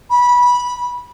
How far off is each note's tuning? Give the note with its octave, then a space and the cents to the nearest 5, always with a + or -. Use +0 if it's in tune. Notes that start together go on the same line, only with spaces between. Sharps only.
B5 -15